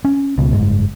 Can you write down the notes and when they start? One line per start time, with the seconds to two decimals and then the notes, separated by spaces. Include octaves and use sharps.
0.05 C#4
0.38 C#2 B2
0.53 F#1 G#2